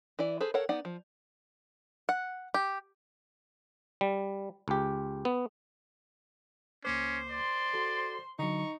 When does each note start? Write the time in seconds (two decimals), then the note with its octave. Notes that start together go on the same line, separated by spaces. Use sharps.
0.19 E3 E4 D5
0.40 G#4 A4 B4 C5
0.54 A4 A#4 C#5 F5 F#5
0.69 B3 D#4 D5 F#5
0.85 F3
2.09 F#5
2.54 G4
4.01 G3
4.68 C#2 G4
5.25 B3
6.85 C#2 A#3 C#4 C5 D6
7.30 D5 C6
7.74 F#4 A4
8.39 D3 F#3 D#4 C#6